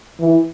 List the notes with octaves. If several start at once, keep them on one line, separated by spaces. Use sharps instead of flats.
E3